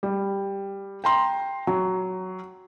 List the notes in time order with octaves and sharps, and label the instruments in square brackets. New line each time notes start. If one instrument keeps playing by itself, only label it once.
[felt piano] G3
G5 A#5 C6
F#3